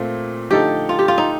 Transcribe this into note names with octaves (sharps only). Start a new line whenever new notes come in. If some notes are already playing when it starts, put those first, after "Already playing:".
Already playing: A#2 A3 C4
D3 F3 A3 D#4 G4 A4
F4
G4
F4
D#4